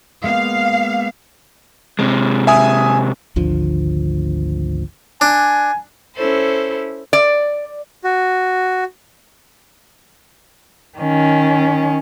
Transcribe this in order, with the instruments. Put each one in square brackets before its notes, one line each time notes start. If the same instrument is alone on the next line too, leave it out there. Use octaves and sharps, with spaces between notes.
[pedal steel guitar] G#3 A#3 B3 [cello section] F5
[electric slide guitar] C3 G#3
[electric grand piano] E5 G#5 D#6
[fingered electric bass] G#1 D2 D3 F3
[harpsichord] D4 [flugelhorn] G#5
[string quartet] C#4 E4 A4 C5
[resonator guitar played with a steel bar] D5
[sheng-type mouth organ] F#4
[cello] D#3 C#4